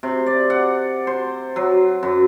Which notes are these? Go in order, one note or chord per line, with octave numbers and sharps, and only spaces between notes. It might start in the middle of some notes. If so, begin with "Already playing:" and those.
C3
D5
F#5
C5
F#3
F#2